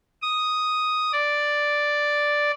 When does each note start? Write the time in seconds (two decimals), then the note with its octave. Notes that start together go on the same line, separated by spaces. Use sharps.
0.22 D#6
1.12 D5